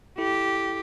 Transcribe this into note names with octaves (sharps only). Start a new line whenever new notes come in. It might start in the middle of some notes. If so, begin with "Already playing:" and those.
E4 G4 A4